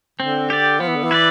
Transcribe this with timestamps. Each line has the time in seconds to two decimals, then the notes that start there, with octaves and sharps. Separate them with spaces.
0.20 D3 C4
0.50 G4 D5
0.80 F3 B3
0.88 E3
0.96 D3
1.04 E3
1.11 E4 B4 D5